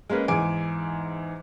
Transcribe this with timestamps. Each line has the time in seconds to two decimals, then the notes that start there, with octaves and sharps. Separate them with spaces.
0.10 G#3 A#3 C#4 B4
0.28 E2 G#2 G#5 D6 D7